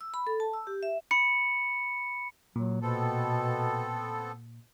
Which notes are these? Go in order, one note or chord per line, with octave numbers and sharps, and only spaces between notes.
E6
B5
A4
A5
E6
G4
E5
B5 C#7
A#2 F#3
B2 B3 C4 A4